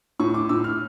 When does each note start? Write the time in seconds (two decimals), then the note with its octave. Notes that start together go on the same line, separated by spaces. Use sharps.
0.20 A2 C#6
0.34 D6
0.49 A2 E6
0.64 F6